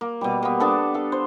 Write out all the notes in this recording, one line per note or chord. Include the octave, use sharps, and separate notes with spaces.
A#3
B2 G3
A#3 B3
B3 D4 A4 A5
A4 F5
C5